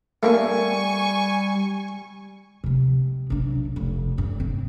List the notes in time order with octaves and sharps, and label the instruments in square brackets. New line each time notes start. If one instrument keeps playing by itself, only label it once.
[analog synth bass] G3 [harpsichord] A3 A#3 D4 [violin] G#5 C#6
[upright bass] C3 G#3
B1 D4
F1
F1 G2
C4